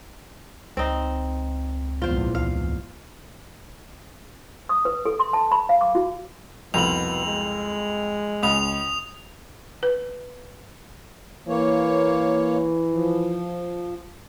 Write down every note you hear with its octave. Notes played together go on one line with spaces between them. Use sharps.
C#2 C4 D#4
A#1 E2 G#2 F4 C5
C#2 F5
D#6
B4
A4
C6
A5
B5
F5
D6
F#4
C2 F2 B2 F7 F#7
G#3
C#2 D#6 F7
B4
E3 A#3 C#5
F3